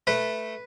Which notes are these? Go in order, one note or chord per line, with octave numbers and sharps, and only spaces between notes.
A3 B4